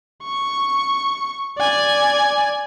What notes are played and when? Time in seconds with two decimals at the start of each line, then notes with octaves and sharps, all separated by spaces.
0.24 C#6
1.58 D5 G#5